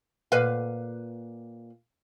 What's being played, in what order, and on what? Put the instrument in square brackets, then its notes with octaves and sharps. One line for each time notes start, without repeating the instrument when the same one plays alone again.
[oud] A#2 B4 F5